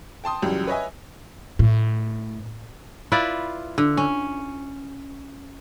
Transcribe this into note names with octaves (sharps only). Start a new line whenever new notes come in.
G5 A5 C6 D#6
C#2 F#2 E3 G3
B4 C#5 D#5 E5 G#5
A2
E4 F4 B4 D5
D3
C#4